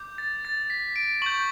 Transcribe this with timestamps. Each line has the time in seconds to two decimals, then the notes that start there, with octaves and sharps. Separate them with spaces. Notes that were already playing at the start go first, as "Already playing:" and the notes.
Already playing: D6 G6
0.18 A6
0.45 A6
0.70 B6
0.96 D7
1.22 C#6 G6 F#7